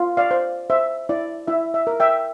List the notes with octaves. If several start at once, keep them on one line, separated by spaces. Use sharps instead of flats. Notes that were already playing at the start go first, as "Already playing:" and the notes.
Already playing: F4
D5 F5
C5
C5 E5
E4 D5
E4 E5
E5
A#4
E5 G5